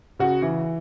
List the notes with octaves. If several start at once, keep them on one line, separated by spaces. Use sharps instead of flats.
C#3 F#4
E3